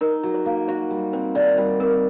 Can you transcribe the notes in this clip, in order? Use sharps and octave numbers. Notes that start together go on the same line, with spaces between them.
D#4 A#4
F#3
C5
A#3
F#4 C5
G3
C4 C5
D#3 D5
G3 C5
C4 A#4